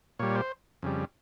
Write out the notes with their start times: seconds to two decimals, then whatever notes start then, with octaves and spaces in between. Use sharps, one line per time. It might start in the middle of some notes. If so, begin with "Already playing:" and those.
0.19 A#2 G3 C#5
0.35 C5
0.83 F2 C#3 G3